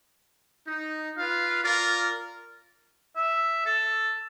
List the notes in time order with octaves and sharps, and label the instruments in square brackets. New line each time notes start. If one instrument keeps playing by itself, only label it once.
[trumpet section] D#4
F4 B4 F5
F4 A#4 D5
[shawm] E5
A4